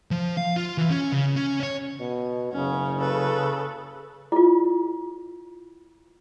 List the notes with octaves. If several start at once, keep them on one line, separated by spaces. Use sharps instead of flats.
F3
F5
F4
E3
C#4
C#3
C#4
C#5
B2
F#1 C#3 C#4
A4 B4
E4 F4